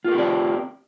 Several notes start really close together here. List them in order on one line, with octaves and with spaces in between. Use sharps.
F4 A#4 G4 C4 D5